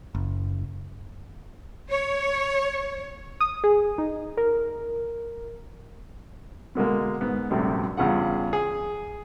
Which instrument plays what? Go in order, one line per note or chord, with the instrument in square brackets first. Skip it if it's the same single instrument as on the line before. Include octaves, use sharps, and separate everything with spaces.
[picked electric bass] F#1
[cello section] C#5
[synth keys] D#6
G#4
D#4
A#4
[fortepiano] B2 D3 G#3 A#3
G#2 B3
A#1 F#2 C3 G3 A3
E2 G2 C#3 F4 G#4 F#5
G#4